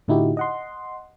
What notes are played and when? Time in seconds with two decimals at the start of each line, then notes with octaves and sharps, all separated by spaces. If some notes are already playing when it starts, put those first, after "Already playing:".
0.08 A2 D3 D#4 E4 F#4 G4
0.37 D#5 F#5 C6